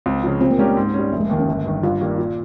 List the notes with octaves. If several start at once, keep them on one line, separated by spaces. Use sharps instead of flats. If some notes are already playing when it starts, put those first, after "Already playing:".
C#2 C4
C#3 F3
A#2 C4
A#3
G3 G#3 C#4 G4 A#4
A#3
G#2
G3 C#4
F1 A#3
G#3
D#2 D#3 A#3
C#4
G1
G2 D#3
G2 F4
D#3 G3 A#3
A#2